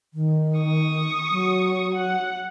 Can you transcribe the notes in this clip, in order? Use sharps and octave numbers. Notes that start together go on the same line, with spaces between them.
D#3
C#6 D#6
F#3
F#5